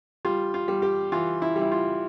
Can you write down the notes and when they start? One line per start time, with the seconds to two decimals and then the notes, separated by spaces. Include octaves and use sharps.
0.25 G3 F4
0.54 F4
0.68 G3
0.82 G4
1.12 E3 F4
1.42 E4
1.56 G3
1.62 E4
1.72 F4